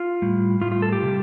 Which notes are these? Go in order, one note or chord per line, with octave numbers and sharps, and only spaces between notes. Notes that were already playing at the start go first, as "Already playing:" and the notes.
Already playing: F4
A2 G3
A2 G3 F4
F4
A4
G4
C3 G3